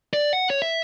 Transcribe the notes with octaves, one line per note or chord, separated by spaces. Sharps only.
D5
F#5
C#5
E5